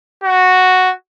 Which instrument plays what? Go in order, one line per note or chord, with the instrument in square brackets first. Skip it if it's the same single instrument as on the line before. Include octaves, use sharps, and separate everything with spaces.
[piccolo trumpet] F#4